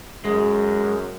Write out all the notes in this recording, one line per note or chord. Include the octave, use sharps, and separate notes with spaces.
F#2 G#3